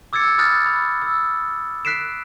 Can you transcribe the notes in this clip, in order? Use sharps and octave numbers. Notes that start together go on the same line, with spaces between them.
D6 E6 G#6 A6 C#7
B5 D#6 F6 F#6 A6
B5
E6
F#6 B6 C7 D7 E7